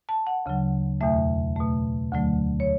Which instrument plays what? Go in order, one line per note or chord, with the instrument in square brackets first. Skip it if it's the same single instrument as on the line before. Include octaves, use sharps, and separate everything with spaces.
[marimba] A5
F#5
D2 C#3 F#3
E2 B2 A3 E5
B2 A3
D2 D3 F#3 A3
C#5